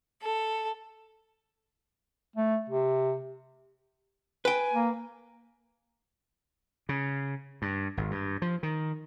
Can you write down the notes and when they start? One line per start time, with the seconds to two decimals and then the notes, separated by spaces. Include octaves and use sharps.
0.21 A4
2.36 A3
2.70 C3
4.45 B4 G5 G#5
4.73 A#3
6.89 C#3
7.62 G2
7.97 G#1
8.11 G2
8.42 F3
8.63 D#3